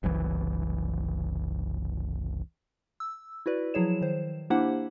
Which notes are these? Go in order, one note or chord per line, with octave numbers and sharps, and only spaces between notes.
F#1 C2 E3
E6
E4 F#4 B4 D5
F3 F#3 E4 G#4 C#5 E7
D#3 C5
A#3 D4 E4 G4 C5 F#5